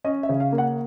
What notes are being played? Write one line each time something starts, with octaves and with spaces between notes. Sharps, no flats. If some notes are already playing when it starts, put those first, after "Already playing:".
C#4 D#5
E5
C#3
F5
A#3
F#5